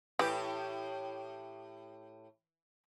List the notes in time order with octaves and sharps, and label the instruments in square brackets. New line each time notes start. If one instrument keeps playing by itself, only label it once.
[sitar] A2 G4 [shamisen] E3